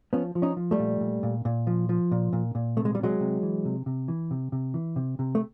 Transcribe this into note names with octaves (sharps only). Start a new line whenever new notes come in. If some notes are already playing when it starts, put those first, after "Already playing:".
F3 B3 C#4
F3
C#4 D#4
F3
G3 A3
A#2
A#2
A#2
A#2
F3
F3
A#2
A#2
A#2
C3 A3
G#3
G3
C3 F#3 G#3
C3
E3
C3
C3
E3
C3
C3
E3
C3
C3
A3